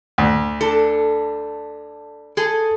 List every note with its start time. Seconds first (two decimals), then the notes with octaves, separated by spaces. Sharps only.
0.18 D2
0.61 D4 A4
2.37 G#4 A4